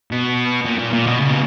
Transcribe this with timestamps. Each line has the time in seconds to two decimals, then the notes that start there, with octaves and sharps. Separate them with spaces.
0.11 B2
0.65 A#2
0.79 A#2
0.93 A#2
1.07 B2
1.20 C#3
1.30 B3